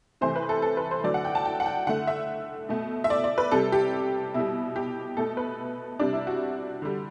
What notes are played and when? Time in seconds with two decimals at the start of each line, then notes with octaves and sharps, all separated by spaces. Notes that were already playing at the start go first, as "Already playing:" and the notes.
0.21 C3 E3 A3 C5
0.36 B4
0.49 A4
0.62 A4
0.77 B4
0.91 C5
1.04 D3 F#3 A3 D5
1.14 F#5
1.25 G5
1.35 A5
1.45 G5
1.60 F#5
1.66 G5
1.87 D3 A3 F#5
2.07 E5
2.69 B2 A3
3.04 E5
3.10 D5
3.24 D5
3.38 B4
3.51 C3 G3 A4
3.72 G4
4.34 B2 G3 E4
4.76 G4
5.17 B2 A3 A4
5.37 B4
5.99 C3 G3 D4
6.13 E4
6.27 F#4
6.82 D3 G3